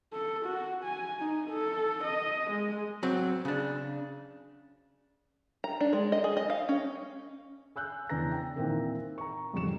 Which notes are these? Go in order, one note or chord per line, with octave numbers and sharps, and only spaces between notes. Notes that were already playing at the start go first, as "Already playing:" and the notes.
A4
F#4
G#5
D#4
A4
D#5
G#3
F#3 C4
C#3 D4
A#5
D4
G#3
D#5
G#4
D#5
F5
C#4
G#5 E6 F#6 G6
E2 C#3 D4 B4 A#5 A#6
G5
A#2 D#3 E3 C4 A#4
A#5 C#6
A1 F2 C#3 G3 C#6 E7